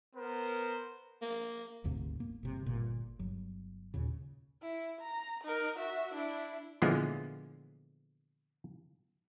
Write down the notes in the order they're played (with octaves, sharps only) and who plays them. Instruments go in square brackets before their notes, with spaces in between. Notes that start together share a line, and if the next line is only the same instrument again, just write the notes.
[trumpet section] B3 A#4 C5
[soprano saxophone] A#3
[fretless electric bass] F#1 D2 G#2 C3
A#3
G1 C3
G1 A#2
G1 F#3
D#2 A#2 C#3
[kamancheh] E4
A#5
D#4 A#4
F#4 E5
D4 E4
[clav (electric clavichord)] A#2 D3 E3 F3 G#3 B3